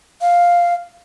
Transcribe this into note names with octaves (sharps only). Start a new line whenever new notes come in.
F5